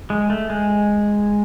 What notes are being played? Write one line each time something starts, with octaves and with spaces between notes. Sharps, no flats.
G#3
A3
G#3